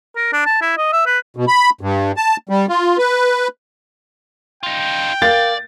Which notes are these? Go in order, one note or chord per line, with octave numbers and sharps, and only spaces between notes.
A#4
D4
A5
E4
D#5
E5
B4
B2
B5
G2
A5
G3
F4
B4
D#4 F4 G5
A#4 D5 F5 A6